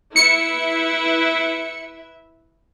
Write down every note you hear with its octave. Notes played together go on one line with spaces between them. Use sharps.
E4 B4 E5 C#7